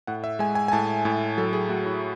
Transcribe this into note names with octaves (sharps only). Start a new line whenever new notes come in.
A2 F#5
E5
G#3 G#5
G#5
G#5
A2 A5
A2 G#5
F#3 A4
G#4
A3 F#4
E4